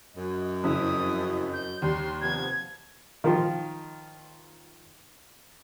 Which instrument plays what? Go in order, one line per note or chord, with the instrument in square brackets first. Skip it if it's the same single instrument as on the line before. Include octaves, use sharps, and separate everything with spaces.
[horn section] F#2 D#5
[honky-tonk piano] F2 C#3 E4 [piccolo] D#6
[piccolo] G6
[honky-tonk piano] D#2 G3 [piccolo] C6
[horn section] C3 F3 B3 [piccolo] G#6
[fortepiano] D#3 F3 F4